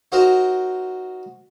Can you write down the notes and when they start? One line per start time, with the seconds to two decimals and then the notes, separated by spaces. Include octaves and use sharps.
0.12 D#4 F#4 A#4 C5 A#5